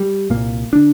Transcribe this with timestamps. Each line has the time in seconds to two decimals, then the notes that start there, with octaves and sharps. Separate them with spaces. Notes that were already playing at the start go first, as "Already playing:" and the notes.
Already playing: G3
0.30 C2 A#2 A#3
0.73 D3 D4